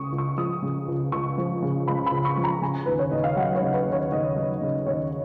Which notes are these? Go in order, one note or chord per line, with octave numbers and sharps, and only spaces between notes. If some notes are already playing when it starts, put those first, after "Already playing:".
Already playing: C#2 C#3 C#6 D#6
C#2
C#6
F3 D#6
C#3
C#2
C#2 C#6
F3
C#3
C#2 B5
B5
C#2
C#6
F3
A#5
C#3 G#5
D#2 B4
C#5
D#2 D#5
F5
F#3 F#5
C#5
C#3
B4
D#2
C#5
D#2 D#5
F#3
C#3
D#2 C#5